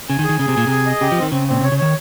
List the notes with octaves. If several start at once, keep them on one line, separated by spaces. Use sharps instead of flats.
C#3 G#5
D#3
G#4
D#3
C#3 G#4
C3
A#2 G#5
C3 G#4
D#5
C#3 G4
F3
C4
D#3
C#3 C4
A#2 C4
C3 C#5
C#3
D#3 C#5